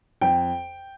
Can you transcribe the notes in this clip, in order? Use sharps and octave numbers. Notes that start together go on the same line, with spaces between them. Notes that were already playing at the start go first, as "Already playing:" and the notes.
F2 G5